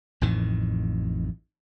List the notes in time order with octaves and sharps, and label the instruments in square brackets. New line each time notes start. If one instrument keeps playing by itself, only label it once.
[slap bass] A1 F2 A2 D#3